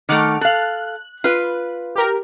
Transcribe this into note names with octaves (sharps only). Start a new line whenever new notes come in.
D#3 A3 F#5 D6 F6
A4 F5 F#6
F4 B4
G4 A#4